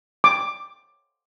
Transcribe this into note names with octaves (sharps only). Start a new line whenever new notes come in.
D6